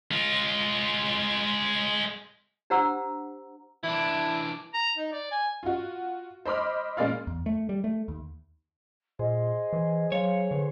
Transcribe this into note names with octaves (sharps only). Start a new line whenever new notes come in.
G#3 F4
D4 G4 C5 F#5 A#5 E6
E3 D4 E4
A#5
D#4
D5
G#5
F4 F#4
C5 D#5 B5 D6 F6
A#2 C#3 G#3 D5 F5 F6
E2
A3
G3
A3
D#2
A#2 G#4 C5 D#5
E3
F#3 C#5 F5
D3 B4